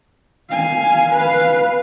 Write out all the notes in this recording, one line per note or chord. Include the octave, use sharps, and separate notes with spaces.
F5 G#5
B4 F5